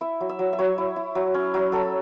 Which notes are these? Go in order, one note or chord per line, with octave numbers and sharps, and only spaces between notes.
E4 E5
F#3
E5
F#3
E5
F#3 C#5
E4
E4
F#3
C#4
F#3
F#3 A4